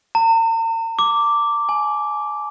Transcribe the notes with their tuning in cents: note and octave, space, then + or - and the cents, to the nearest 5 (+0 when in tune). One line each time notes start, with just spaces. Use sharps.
A#5 -45
D6 -5
G#5 +25